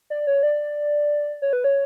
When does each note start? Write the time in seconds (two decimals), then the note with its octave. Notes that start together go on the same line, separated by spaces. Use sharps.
0.10 D5
0.27 C#5
0.43 D5
1.42 C#5
1.53 B4
1.64 C#5